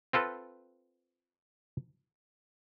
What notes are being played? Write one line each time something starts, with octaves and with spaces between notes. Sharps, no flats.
C4 F4 A4 B4